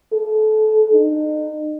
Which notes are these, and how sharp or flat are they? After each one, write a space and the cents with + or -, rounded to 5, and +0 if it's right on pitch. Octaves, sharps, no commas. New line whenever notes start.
A4 -25
D#4 -35